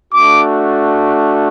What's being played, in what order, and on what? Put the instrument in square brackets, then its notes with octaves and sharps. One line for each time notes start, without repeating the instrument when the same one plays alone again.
[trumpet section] A3 D4 F#4 D6